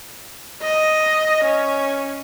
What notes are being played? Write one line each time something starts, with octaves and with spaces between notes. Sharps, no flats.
D#5
C#4